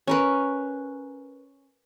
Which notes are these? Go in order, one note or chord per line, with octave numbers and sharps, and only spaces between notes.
C#4 A#4 B4